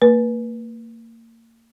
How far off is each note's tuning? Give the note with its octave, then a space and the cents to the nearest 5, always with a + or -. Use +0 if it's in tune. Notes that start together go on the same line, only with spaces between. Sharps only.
A#3 -30 B4 -25